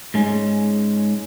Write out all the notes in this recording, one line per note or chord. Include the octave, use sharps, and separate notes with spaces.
G#2 G#3 C#4